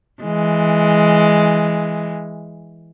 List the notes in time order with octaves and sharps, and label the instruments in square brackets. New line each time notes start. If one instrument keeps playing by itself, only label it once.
[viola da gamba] E3 G#3